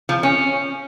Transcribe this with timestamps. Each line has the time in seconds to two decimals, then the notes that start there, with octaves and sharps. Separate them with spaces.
0.09 F3
0.23 C#4